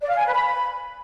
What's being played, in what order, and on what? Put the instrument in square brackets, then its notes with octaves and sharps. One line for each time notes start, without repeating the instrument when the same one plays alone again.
[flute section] D5
F5
G#5
B4
B5